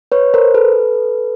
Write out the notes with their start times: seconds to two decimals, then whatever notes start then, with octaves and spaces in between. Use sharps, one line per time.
0.12 B4 C#5
0.34 A#4 C5
0.54 A4 B4